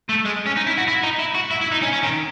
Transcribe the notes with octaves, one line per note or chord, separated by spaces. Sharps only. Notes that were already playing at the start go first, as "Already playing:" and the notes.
A3
G#3
C#4
D#4
E4
F#4
E4
D#4
E4
F#4
E4
E4
D#4
C#4
C#4
D#3